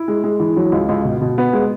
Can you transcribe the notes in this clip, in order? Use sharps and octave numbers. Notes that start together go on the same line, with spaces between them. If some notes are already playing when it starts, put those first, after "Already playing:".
Already playing: E4
G#3
G#3
E3
F#3
C#2
C#2
B2
B2
B3
G#3